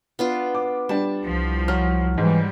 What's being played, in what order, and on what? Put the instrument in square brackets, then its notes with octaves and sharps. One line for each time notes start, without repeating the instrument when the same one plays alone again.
[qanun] B3 D4 F4
[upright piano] D6
[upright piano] G3 D4 [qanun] A5
[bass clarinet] C2 [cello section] F3
[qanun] F#3 [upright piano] F6
[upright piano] G#2 [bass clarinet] E3 [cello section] G3 G#3